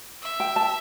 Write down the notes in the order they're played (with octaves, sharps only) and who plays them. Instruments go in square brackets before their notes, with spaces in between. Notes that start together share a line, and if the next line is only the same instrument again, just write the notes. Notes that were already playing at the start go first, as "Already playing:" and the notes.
[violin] E5
[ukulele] G5
A5